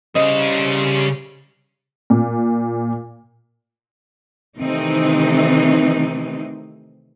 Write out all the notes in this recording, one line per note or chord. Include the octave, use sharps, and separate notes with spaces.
C#3 G3 C5 D#5
A#2
C3 D#3 E3 A3 C4 D#4